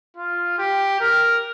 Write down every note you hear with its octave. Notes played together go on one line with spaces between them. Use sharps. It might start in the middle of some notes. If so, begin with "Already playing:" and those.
F4
G4
A#4